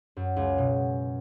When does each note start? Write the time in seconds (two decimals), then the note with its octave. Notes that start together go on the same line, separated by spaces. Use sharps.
0.17 F#2
0.36 C#2
0.58 B2